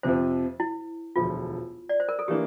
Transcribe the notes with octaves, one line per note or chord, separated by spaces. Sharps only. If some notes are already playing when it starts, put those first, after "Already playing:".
F2 C3 F3 C5
E4
E1 D2 D3 F3 F4
D5
C5
A#4
A4
E3 A#3 D4 G4